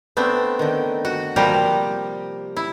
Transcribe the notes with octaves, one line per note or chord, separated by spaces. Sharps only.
A3 B3 C4 D4
D3 D#3
F#4
C3 F3 G3 A#3 G4 A#5
E4